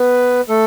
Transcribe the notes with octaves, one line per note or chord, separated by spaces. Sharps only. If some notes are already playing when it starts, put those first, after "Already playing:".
Already playing: B3 B4
A3 A4